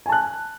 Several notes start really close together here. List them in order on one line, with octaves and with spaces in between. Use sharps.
G#5 A5 F#6